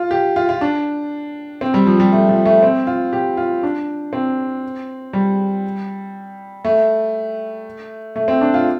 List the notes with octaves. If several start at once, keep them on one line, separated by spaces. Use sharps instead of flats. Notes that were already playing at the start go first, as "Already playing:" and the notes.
Already playing: F4
G4
F4
F4
D4
C4
G3
F3
G3
A3
F3
A3
C4
F4
G4
F4
D4
C4
G3
A3
A3
C4
D4
F4